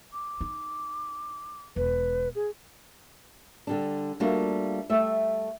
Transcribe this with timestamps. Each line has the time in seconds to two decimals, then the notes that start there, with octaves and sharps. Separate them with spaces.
0.13 D6
0.41 D#4
1.76 E1 B4
2.35 G#4
3.67 D3 G3 D4
4.20 G3 A3 A#3 D4 F4 F#4
4.90 G3 A3 E5